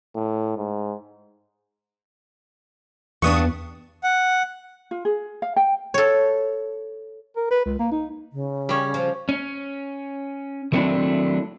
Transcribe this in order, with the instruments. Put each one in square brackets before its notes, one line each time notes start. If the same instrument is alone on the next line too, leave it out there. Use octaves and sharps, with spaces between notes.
[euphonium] A2
G#2
[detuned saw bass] E2 [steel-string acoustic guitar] G2 B3 D4 [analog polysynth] C#6 D#6
[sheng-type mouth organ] F#5
[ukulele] F4
G#4
F5
G5
[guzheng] A4 C#5
[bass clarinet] A#4
B4
C#2
A#3
D#4
[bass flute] C#3
[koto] G3 C#4
[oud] F3
[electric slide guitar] C#4
D#3 F#3 A3 C4 D4 E4